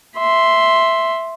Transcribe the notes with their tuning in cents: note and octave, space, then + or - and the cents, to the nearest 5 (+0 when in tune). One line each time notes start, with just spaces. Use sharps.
E5 +0 C6 +0